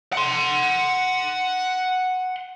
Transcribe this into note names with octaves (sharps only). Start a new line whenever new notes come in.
F#5 C6